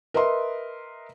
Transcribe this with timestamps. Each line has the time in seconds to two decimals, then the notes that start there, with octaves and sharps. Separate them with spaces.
0.14 A#4 B4 D#5 E5 C6